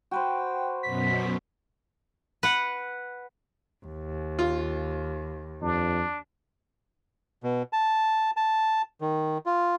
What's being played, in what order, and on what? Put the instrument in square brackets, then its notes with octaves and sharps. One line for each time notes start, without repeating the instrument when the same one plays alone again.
[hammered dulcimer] F#4 B4 C5 [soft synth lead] G5
[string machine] F#2 B2 [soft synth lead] B6
[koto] B4 F#5
[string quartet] D#2
[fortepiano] F4
[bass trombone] F2 [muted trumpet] D4
[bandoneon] B2
A5
A5
D#3
F4